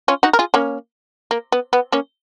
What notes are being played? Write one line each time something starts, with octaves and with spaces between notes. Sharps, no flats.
C#4 F4
D#4 F#4
A#4
F4 G#4
A#3 C#4
A#3
B3
B3
A#3 C#4